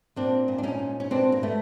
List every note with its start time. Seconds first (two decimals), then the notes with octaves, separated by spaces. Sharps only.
0.16 A#2 C4 D4
0.48 A#2
0.58 D4
0.63 C#4 D#4
0.79 A#2
1.00 C#4
1.11 B2 C4 D4
1.32 A#3
1.42 B2 A3 B3